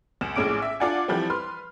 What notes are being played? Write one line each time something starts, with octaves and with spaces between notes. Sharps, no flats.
C#2 E7
A#1 A2 G#3 C#4 D6 D7
E5
D4 F4 D5 F#5 G#5
E3 F3 G3 C4
B4 C6 F6